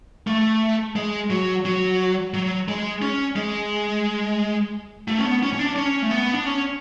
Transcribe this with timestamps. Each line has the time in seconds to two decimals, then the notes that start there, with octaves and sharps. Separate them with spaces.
0.27 A3
0.96 G#3
1.30 F#3
1.65 F#3
2.34 F#3
2.68 G#3
3.02 C#4
3.36 G#3
5.08 A3
5.19 C#4
5.25 B3
5.43 C#4
5.53 C#4
5.59 D4
5.76 C#4
6.02 A3
6.11 B3
6.33 D4
6.46 C#4